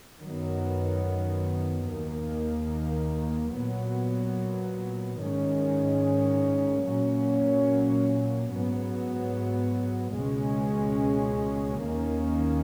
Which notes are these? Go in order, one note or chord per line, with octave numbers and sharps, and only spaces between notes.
F#2 D#3 F#3 B3
D#2 D#3 A#3
A#2 F#3 B3
G#2 D#3 G#3 C#4
A#2 F#3 A#3 C#4
G#2 F#3 B3
C#2 B2 G#3 C#4
D#2 D#3 A#3 C#4